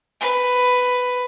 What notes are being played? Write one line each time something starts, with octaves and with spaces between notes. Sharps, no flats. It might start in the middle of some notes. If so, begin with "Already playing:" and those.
B4